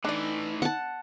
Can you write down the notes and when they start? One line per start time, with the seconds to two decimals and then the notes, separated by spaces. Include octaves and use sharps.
0.05 A2 E3 D4 D#4 D5
0.62 F#5 A5